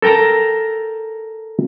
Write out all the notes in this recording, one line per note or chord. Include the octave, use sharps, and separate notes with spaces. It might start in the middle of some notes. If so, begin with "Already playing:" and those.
A4 A#4 G5 A5 A#5